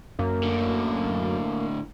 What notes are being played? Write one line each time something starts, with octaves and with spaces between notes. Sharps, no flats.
F#2 A#3
A2 D3